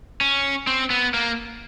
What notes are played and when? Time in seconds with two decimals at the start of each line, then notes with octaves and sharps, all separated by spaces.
0.21 C#4
0.67 C4
0.90 B3
1.14 A#3